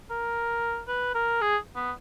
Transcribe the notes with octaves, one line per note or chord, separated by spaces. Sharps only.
A#4
B4
A#4
G#4
B3